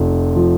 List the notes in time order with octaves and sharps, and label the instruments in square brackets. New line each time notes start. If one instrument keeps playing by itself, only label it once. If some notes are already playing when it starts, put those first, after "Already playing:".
Already playing: [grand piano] F1 F3
F3